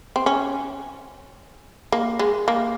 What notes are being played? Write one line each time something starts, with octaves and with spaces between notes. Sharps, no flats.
C4
C#4
A#3
G#3
A#3